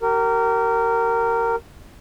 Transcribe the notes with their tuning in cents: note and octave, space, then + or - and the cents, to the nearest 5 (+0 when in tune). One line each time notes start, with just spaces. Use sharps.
G4 -40 A#4 -15